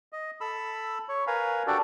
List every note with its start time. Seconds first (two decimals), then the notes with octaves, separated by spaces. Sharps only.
0.12 D#5
0.41 A4 B5 E6
1.09 C#5
1.27 A#4 B4 F5 G#5
1.67 D4 F#4 G4 A4 D5